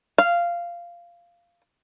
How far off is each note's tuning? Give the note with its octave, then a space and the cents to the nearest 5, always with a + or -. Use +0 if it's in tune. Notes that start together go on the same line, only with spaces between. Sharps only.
F5 -10